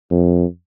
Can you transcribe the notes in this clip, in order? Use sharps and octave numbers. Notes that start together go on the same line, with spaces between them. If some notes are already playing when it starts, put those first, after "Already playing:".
F2